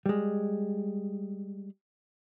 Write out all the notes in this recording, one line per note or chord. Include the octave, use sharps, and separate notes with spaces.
G3 G#3